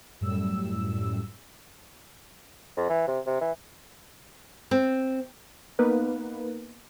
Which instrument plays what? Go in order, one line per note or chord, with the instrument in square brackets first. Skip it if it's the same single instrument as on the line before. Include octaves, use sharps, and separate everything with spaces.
[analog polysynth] F#2 A2 G3 E6
[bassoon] F2
E3
C3
C3
E3
[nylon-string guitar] C4
[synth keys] A#3 B3 D#4 A#4 B4